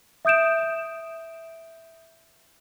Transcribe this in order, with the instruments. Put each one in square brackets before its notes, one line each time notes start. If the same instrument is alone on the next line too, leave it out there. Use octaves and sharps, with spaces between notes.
[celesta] E5 D#6 G6 D7 E7